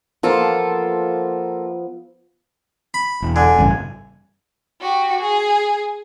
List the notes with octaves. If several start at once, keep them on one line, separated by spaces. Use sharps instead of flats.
F3 A#3 B3 F4 A4
B5
E1
D3 G#5
A1 G2 C#3
F#4 G4
G#4